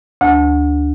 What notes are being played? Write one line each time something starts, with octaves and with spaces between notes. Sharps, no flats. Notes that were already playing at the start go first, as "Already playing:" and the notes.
D2